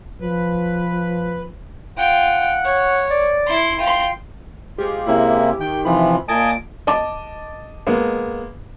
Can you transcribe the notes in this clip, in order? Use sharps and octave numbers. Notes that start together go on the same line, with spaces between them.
F3 B4
F4 F#5 G5
C#5
D5
E4 C6
F4 G5 C6
G#3 C4 F4 G4
C3 G#3 A#3 C#4 E4
D#3 G5
C3 E3 F3 B5
A#2 A#3 D#5 G#5 A5 D7
D#5 A5 D6
G#3 A#3 B3